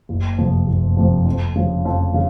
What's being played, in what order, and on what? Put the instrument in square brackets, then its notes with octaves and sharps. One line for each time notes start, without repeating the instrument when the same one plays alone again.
[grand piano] F#1
F2 C3 F3
F#1
F2 C3 F3
F2
C#3 F3
F2
C#3